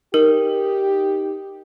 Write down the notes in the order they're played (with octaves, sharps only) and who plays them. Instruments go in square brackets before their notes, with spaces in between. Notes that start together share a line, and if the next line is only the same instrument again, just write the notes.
[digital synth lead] D#4 [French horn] G4 [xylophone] A#4